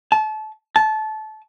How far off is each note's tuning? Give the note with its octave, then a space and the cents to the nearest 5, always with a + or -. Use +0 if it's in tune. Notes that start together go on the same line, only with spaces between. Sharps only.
A5 -30
A5 -20